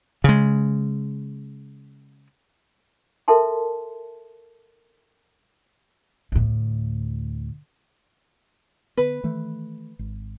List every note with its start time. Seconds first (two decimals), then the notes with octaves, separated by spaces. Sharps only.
0.24 C#3 G#3
3.28 A4 A#4 E5 A5 C6
6.32 D2 A2
8.97 D3 B3 B4
9.24 D#3 E3 A3
9.99 G#1